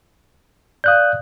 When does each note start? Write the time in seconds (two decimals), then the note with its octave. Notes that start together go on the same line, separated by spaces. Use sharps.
0.84 D5 F5 D#6 F#6 G6